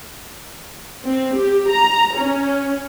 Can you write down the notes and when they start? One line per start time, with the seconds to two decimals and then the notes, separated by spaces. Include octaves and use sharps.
1.04 C4
1.35 G4
1.68 A#5
2.17 C#4